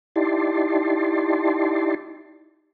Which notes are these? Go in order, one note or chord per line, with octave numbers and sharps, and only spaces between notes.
D#4 E4 G4 D5 A5 C6